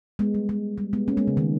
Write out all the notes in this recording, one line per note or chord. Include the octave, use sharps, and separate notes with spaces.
G#3 B3
G3
G#3
G3
G#3 B3
A#3 C#4
G#3 B3
C#3
D#3